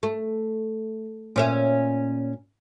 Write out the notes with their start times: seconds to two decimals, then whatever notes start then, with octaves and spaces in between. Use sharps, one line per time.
0.03 A3
1.36 A#2 C#4 E5